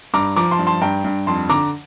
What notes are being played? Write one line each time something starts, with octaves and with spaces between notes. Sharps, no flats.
G2 A#5 D6
F3 A#5 D6
A5 C6
G2
A5 C6
G2 G5 A#5
G2
F2 A5 C6
D3 A#5 D6